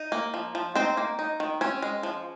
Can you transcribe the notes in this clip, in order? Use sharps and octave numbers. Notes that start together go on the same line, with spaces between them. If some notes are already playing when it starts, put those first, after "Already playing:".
Already playing: D#4
A#3
F3
F3
C4 D#4 C5
A#3
D#4
D#3
C4 C#4 C#5
G#3
F3